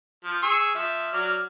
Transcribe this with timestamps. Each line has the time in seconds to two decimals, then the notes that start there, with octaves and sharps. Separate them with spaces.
0.24 F3
0.42 G#4 C#6 E6
0.74 F3 E5
1.13 F#3 D5 F6